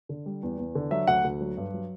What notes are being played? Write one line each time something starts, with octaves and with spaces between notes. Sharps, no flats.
D3
G3
E2
E2
D3
F#3 E5
D2 F#5
D2
F#3
G2
F#3